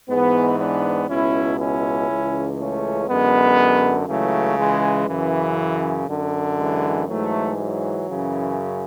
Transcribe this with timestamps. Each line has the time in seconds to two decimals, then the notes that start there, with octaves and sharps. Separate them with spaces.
0.09 G#2 E3 G#3 B3
0.59 B3 D4
1.09 C#2 B2 C#4 E4
1.59 C#4 E4
2.09 C#2 C#3 E3
2.59 A3 C#4
3.09 F#2 D3 G#3 B3
4.08 C#2 C#3 E3 F#3 A3
4.59 E3 G#3
5.08 F#2 C#3 E3
6.09 F#2 D3
6.58 E3 G#3
7.08 G#2 E3 F#3 A3
7.59 F#3
8.09 F#2 C#3 E3